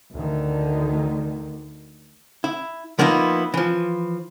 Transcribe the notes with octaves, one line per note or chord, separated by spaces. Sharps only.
D2 D3 D#3
E4
F3 A#3 B3 D#4 E4
E3 F3